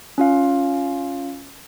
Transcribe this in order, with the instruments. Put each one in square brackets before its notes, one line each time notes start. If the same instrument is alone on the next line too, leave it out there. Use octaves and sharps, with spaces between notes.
[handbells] C#4 F4 F5